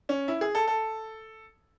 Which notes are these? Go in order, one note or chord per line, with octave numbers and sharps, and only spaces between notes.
C#4
E4
G#4
A4
A4